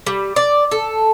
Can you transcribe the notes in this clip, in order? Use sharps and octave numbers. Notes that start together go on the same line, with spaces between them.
G3
D5
A4